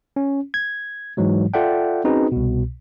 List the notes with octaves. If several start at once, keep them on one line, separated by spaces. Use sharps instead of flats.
C#4
G#6
G#2 E3 F#3 G#3
F4 A4 D5 E5 F#5 G5
C4 C#4 D#4 F#4 G#4 B4
C2 B2